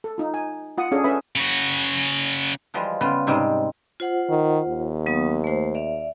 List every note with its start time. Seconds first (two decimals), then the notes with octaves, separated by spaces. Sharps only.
0.04 A4
0.18 D#4 F4
0.34 G#5
0.78 F4 F#5 D#6
0.92 C#4 D4 G#4 A4
1.04 C#4 A4 B4 E5 B5 D#6
1.36 C#3 F#4
2.74 E3 F3 G3 G#3
3.01 C#3 G3 B3 F4
3.27 G#2 C3 G3 G#3 D#5
4.00 F4 C5 F#5
4.30 D#3
4.68 D#2
5.06 F#3 B3 D#6
5.44 A3 C5
5.75 D5 E5 F5